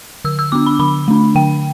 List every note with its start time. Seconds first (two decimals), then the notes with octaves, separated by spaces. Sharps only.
0.25 D3 E6
0.39 E6
0.52 B3 D4 D6
0.66 B5
0.79 D3 B5
1.08 A3 D4
1.35 D3 G5